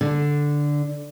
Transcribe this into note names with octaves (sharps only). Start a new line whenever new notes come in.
D3